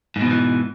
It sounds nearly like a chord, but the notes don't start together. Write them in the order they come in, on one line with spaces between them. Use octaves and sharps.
G#2 B2 F3 E3